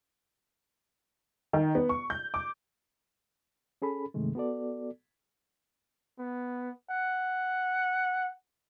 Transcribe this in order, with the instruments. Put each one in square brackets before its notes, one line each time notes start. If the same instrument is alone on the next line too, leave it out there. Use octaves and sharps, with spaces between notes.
[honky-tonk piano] D#3
B3
C#6
G6
D6
[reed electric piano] C#4 G#4 A4 B5
G2 C3 D#3 G#3 A3
B3 F#4 A4 D5
[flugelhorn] B3
F#5